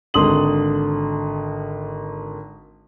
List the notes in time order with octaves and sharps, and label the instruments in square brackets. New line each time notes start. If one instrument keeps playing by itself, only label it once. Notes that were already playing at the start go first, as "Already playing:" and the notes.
[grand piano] G#1 D3 C6 D#6 F#7